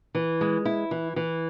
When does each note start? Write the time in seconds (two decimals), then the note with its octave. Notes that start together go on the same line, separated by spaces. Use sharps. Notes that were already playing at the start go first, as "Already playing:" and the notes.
0.15 E3
0.41 G#3
0.65 E4
0.91 E3
1.16 E3